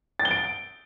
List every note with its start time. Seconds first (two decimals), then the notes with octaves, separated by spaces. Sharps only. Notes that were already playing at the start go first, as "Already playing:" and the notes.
0.19 A6
0.25 G7
0.31 D7